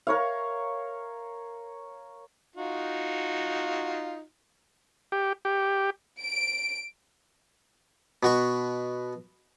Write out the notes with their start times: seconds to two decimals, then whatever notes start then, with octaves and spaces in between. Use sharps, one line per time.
0.07 A#4 C#5 F5
2.56 D#4 F4 F#4
5.12 G4
5.45 G4
6.20 D7
8.23 B2 F#4 C#6